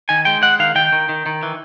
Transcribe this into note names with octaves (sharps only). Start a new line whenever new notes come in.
D#3 G#5
G#3 G5
G#3 F#5
D#3 F5
D#3 G5
D#3
D#3
D#3
E3